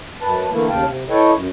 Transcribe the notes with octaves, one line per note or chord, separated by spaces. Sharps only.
F#2 B4 A5
D3 E3 A3 A#3 E4
D#2 C#3 F5 G5 A5
C3
E4 A4 B4 C#5 D#5 G5
F#2